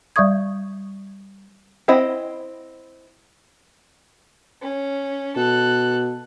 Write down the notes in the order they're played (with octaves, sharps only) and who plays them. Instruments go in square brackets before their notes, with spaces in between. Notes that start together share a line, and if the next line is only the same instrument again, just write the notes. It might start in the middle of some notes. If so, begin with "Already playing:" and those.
[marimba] G3 D5 E5 C#6 D#6 G#6
[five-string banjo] C4 E4 D#5 F#5
[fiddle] C#4
[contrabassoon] B2 [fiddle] A4 F#6